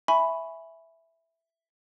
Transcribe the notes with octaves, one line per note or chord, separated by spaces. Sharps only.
E5 G#5 B5 C#6